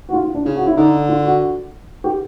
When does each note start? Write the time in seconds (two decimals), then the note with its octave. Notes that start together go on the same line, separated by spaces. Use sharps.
0.09 F#4
0.13 F4
0.24 F4
0.35 D4
0.45 C#3 F4
0.56 F#4
0.67 E4
0.77 D3 D#4
1.09 F4
1.24 F#4
2.04 G4